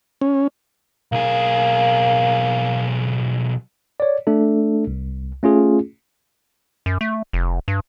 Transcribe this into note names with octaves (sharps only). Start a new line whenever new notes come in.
C#4
B1 A#3 G#4
C#5 D5
A3 D4 A4
C2
A3 C#4 F4 G#4
F#2
A3
F1
G2